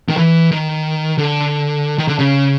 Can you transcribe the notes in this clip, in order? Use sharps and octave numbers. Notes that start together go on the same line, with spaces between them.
D#3
E3
D#3
D3
D#3
D3
C#3